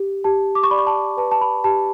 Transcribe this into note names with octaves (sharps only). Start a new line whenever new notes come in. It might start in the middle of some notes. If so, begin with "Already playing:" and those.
Already playing: G4
G4 A5
D6
C#6
D5 B5
C#6
A5
B4 A5
A5
B5
G4 A5